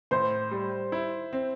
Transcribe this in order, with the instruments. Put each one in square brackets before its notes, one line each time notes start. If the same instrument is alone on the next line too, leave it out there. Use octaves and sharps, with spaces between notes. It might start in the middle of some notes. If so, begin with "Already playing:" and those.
[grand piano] A2 [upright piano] C5 C6
[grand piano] G3
E4
C4